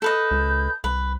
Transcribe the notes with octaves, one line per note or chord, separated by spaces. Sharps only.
A4 B4 D#5 G6
C#2
C2 B4